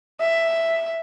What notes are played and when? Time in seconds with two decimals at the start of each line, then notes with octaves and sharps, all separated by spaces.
0.20 E5